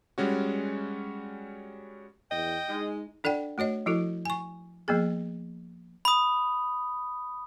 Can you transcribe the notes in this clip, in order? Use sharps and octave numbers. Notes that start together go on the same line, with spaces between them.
G3 G#3 C#4 F#4
E2 D#5 G5
G#3 D#4
D4 A4 D5 F#5 G5
A3 F#4 C#5 D#5
F3 E4 F#4 A4
G#5 C#6
F3 A#3 B3 G#4
B5 D#6